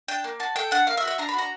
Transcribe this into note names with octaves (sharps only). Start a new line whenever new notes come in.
D4 G5
A#3
F#4 A5
A4 G5
D4 F#5
A#3 F5
E5
F#4
E5
D4 A#5
B5
F#4 A#5